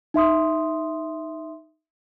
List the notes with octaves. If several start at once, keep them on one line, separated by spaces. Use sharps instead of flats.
D#4 E5 C6 D#6